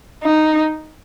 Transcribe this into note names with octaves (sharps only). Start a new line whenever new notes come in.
D#4